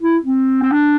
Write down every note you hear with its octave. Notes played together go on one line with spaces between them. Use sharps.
E4
C4
C4
D4